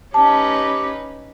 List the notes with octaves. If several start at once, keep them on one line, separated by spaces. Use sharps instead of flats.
C#4 D#4 G4 B4 A5